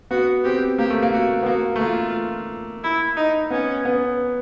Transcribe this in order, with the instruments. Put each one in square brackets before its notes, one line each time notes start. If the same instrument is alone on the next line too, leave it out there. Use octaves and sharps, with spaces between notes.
[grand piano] B3 [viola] F#4
[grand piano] C4 [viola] G4
[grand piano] A#3 [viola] G4
[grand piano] A3
A#3
[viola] F#4
[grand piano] B3
[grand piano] A#3 [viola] F#4
[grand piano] A3
[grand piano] A#3 [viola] F4
[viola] E4
D#4
[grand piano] B3 [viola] C#4
[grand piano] B3